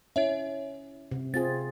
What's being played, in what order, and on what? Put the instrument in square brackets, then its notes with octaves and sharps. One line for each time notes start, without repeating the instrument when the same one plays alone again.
[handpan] C#4 [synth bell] E4 C#5 E5
[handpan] C3
[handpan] C4 F4 G#4 [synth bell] A6